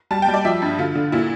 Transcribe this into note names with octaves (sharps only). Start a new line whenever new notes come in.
G3 A5
G5
G3
D5
F3 E5
G2
D3 F4
D3
A#2 E4